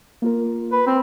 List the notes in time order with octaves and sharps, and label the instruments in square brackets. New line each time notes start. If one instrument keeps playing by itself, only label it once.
[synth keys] A#3 F4 A#4
[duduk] B4
C4